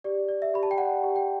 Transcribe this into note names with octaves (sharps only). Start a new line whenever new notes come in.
G4 D5
D5
E5
G4 B5
A5
G5
D5 F#5
G4
G5